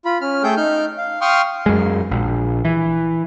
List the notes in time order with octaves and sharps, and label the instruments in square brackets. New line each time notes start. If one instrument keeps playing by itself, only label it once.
[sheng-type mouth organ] F4 B5
C#4 F6
A3 G#4 A4 G5 G6
D#4 F6 G6
F5
F5 G5 C6 C#6 D#6 F6
[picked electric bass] F#2 G#3
A#1
E3